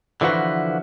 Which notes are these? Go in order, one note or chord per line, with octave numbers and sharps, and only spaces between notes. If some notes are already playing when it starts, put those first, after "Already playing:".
D3 E3 F3 F#4 B4